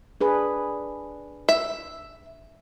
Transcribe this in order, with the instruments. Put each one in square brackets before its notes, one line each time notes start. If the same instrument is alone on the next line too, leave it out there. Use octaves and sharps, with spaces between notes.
[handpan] D4 G#4 B4
[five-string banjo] E5